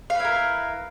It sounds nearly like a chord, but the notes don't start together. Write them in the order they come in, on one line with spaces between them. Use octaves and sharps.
F5 B4 E4 A#4